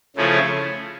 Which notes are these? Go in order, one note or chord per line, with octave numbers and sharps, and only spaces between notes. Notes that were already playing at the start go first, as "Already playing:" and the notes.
C#3 F3 A3 C#4 E4